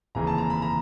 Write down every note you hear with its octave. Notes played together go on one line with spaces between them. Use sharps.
F1 D#2 C#3 E3 A#5
A5
A#5
B5
A#5